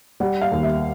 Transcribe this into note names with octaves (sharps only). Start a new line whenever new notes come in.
G3 F#5
F5
D#2
E5